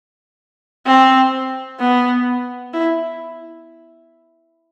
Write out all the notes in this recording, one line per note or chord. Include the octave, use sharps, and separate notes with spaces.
C4
B3
E4